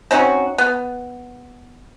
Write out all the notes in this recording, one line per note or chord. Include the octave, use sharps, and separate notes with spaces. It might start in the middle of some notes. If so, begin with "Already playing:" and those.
C4 C#4 D#4 F#4
B3